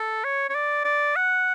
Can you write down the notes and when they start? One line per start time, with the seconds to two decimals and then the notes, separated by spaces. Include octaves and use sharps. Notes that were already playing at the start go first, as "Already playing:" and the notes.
Already playing: A4
0.24 C#5
0.49 C#5
0.54 D5
0.85 D5
1.16 F#5